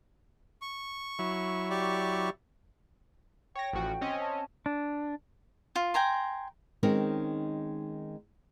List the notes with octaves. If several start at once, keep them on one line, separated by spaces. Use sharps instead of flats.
C#6
F#3 E4
G4 D5 C#6
C#5 G5 A#6
A1 F3 F#4
C4 C#4 D#5
A5
D4
F4
G5 G#5 A#5 C6
D#3 G#3 C4 C#4 D#4 A#4